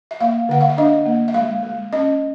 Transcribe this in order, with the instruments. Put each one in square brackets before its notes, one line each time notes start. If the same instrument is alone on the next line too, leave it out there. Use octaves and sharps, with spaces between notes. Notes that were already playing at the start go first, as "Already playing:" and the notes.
[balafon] E5
A#3 F5
D3 F#5
F5
E5
D4 D#5
A#3
E5
G#3 F5
G#3
C#4 D#5